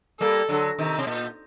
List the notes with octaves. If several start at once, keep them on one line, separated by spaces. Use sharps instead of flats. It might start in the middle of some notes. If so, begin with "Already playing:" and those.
G3 A#3 A4
D3 F#3
C3 D#3
C3
A#2